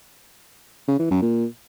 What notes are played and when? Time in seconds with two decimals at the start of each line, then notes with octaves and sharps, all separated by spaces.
0.88 C#3
0.99 E3
1.11 F#2
1.22 A#2